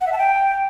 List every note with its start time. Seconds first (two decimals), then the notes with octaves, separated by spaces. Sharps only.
0.01 F#5
0.07 E5
0.12 A5
0.18 G5